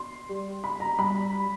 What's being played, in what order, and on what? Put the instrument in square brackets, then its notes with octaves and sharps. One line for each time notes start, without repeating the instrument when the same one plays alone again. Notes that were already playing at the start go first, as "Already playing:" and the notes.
Already playing: [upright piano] C6
[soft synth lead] G3
[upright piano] B5
A#5
[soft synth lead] G3 [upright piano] B5